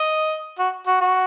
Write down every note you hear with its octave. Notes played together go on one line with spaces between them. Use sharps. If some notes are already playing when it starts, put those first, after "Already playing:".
Already playing: D#5
F#4
F#4
F#4